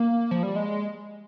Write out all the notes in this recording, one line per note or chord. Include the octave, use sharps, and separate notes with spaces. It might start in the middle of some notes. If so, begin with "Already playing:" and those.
Already playing: A#3
F3
G3
G#3